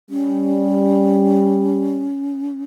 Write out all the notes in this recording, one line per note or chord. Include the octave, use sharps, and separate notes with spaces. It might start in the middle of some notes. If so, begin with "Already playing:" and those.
G3 C#4